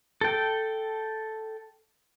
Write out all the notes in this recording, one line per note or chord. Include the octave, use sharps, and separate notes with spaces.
A4 G5